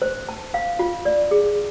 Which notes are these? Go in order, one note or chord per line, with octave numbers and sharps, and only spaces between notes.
C5
A5
F5
F4
D5
G#4